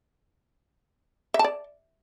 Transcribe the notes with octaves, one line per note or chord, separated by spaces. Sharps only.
E5
A5
D5